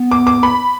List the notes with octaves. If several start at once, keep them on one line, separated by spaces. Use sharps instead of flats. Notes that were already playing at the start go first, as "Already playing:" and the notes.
Already playing: B3
D6
D6
B5